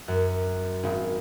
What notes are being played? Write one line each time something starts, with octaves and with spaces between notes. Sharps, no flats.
F#2
G#1 G#2